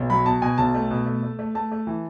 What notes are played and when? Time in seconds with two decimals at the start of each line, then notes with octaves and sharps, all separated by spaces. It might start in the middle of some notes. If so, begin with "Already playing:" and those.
Already playing: B1
0.10 F#3 B5
0.26 B2 A5
0.42 B2 G#5
0.58 B1 A5
0.75 A3
0.91 B2
1.06 A3
1.23 A3
1.39 A3
1.55 A3 A5
1.72 A3
1.87 E3